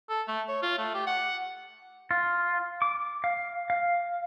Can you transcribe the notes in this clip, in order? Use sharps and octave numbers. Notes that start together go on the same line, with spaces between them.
A4
A3
C#5
F4
A3
G4
F#5
F4
D6
F5
F5